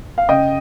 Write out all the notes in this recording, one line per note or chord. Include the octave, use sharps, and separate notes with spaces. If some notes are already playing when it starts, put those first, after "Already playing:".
F5
C#3 D#5 G5